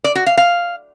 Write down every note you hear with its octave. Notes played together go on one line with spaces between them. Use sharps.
D5
F#4
F5
F5